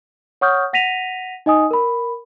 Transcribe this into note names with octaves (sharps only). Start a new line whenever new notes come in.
C#5 F#5 C#6 D#6 F6 G6
F#5 A#6 B6 D#7 F7
D#4 D#5 G#5 D#6
A#4 B5